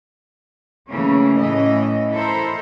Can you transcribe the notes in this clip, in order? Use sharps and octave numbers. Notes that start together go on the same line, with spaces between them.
C#3 E3 A3 A#3 C#4
A2 E3 C#4 D#5
E4 A4 A#4 C5